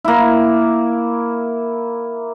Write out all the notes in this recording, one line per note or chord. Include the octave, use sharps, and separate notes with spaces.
A#3 E4